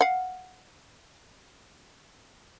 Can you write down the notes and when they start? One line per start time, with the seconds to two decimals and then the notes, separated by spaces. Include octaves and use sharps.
0.01 F5 F#5